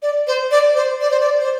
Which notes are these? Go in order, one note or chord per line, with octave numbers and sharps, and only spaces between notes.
D5
C5
D5
C5
D5
C5
D5
C5